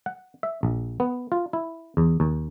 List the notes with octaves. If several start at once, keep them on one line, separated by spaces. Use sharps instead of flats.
F#5
E5
A#1
B3
F4
E4
E2
D#2